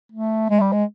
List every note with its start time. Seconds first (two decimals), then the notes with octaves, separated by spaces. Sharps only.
0.12 A3
0.50 G#3
0.60 G3
0.72 G#3